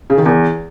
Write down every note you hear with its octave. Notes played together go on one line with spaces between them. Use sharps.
C#3
D#3
E2